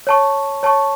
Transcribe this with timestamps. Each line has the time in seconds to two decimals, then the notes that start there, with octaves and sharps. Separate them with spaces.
0.07 C#5 A5 C#6
0.63 C#5 A5 C#6